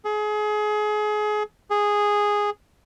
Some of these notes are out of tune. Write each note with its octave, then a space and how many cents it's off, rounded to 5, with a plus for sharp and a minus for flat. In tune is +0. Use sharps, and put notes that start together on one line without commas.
G#4 +30
G#4 -5